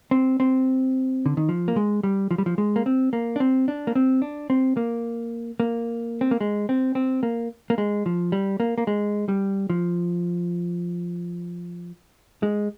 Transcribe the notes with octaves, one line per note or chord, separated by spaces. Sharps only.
C4
C4
D3
D#3
F3
A#3
G#3
G3
F3
G3
F3
G#3
A#3
C4
A#3
D4
C4
D4
A#3
C4
D4
C4
A#3
A#3
C4
A#3
G#3
C4
C4
A#3
A#3
G#3
F3
G3
A#3
A#3
G#3
G3
F3
G#3